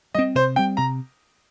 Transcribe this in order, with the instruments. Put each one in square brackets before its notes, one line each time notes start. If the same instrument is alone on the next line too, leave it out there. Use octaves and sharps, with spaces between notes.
[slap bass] G3 C4 [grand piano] D#5
[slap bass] C3 [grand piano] C5
[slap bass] G3 C4 [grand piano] G5
[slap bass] C3 [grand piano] A#5